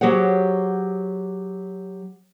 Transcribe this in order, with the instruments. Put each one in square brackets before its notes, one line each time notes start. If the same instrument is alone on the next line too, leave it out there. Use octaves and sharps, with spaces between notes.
[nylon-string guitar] F#3 G4 G#4 C5 C#5 F#5